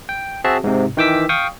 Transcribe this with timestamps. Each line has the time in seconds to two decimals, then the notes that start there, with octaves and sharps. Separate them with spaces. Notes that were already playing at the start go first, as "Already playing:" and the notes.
0.09 G5
0.44 C4 F#4 G#4 E5 A5
0.64 G#2 C3
0.97 D#3 E3 G5 D6 E6 B6
1.29 F5 G5 C#6 D#6